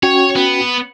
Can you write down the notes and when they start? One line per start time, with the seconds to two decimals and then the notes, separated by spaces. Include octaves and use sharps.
0.03 C#4 F#4 C#5 G5
0.36 B3